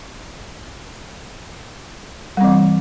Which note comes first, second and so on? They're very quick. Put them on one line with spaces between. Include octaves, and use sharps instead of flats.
G3 C4 E3